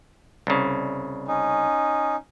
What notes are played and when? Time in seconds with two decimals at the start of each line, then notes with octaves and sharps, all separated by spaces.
0.47 C2 C#3
1.28 C#4 D#4